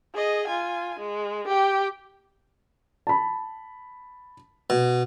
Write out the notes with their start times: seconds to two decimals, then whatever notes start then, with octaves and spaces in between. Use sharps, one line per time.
0.15 G#4 D#5
0.47 F4 G#5
0.99 G#3
1.48 G4 G5
3.07 A5 B5
4.70 B2